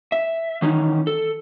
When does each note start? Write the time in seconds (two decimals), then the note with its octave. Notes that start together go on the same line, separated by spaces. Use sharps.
0.12 E5
0.62 D#3 E3 C#4 D#4
1.07 A4